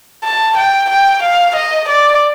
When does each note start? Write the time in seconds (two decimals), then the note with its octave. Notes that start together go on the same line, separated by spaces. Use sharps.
0.24 A5
0.57 G5
0.90 G5
1.23 F5
1.56 D#5
1.89 D5